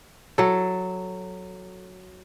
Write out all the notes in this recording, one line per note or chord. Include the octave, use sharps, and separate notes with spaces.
F#3 A4